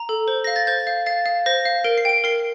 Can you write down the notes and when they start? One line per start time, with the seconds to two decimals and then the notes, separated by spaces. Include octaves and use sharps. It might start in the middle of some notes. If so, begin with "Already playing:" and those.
Already playing: A#5
0.09 A4
0.28 C5
0.44 F5 A#6
0.56 A6
0.67 C5 G6
0.87 F5
1.06 F5 A6
1.26 F5
1.46 C5 A#6
1.65 F5
1.84 A#4 D7
1.98 C7
2.05 G5 D7
2.24 A#4 C7